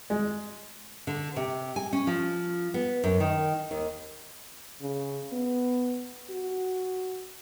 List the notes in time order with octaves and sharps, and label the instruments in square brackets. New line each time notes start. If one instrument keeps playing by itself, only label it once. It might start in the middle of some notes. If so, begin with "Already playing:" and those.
[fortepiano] G#3
[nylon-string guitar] D3
C3
G#5
C#4
F3
B3
F#2
D#3
D#2
[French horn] C#3
B3
F#4